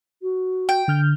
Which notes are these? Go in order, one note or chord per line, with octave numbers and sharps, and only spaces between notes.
F#4
G5
D3 F6 G6